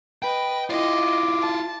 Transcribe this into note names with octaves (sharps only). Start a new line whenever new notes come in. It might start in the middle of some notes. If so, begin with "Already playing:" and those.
B4 D#5 G5
E4 F4 D#5 D6
A5